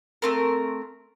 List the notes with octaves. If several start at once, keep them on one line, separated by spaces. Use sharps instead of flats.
A3 C4 A#4